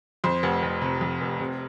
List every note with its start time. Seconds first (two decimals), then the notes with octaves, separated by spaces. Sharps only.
0.24 F2 C5
0.43 F1
0.63 F1
0.82 C3
1.01 F2
1.21 F1
1.40 C3